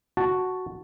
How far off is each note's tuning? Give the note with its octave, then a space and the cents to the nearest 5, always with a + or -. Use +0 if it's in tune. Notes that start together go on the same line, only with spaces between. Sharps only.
F#4 +0 A5 +0